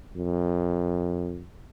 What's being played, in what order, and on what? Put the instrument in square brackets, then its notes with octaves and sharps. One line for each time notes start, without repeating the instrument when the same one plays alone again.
[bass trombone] F2